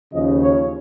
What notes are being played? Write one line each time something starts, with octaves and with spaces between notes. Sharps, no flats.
D#2 C#3 F3 D#5
C#5